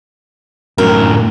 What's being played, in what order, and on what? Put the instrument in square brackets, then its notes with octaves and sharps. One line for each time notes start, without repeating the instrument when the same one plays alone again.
[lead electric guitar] F#2 A2 [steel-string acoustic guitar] A#4